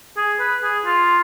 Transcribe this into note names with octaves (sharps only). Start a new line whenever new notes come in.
G#4
B4
G#4
F4